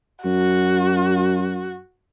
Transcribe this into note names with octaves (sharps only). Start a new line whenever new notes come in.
F#2 F#4